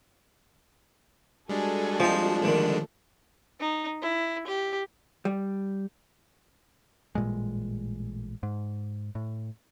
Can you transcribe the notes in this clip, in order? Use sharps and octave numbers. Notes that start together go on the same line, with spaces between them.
G3 G#3 D4 F#4 A4 G#5
F3 C4 D#4
A#1 D3 D#3 A3
D#4
E4
G4
G3
A1 A#2 G3 G#3
G#2
A2